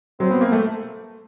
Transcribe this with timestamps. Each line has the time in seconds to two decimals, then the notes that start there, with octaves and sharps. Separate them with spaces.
0.20 F#3 C4
0.31 B3
0.41 A#3
0.52 A3